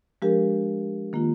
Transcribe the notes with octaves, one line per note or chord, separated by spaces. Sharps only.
F3 G#3 D4 G4 A#4
D#3 A#3 F4